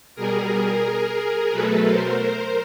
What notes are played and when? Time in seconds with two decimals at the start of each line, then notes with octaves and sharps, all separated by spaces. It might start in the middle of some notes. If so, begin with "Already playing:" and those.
0.15 B2 G3 G#4 A#4
1.51 B2 F#3 A3 A4 B4
1.85 A#4 C5
2.19 A#4 C5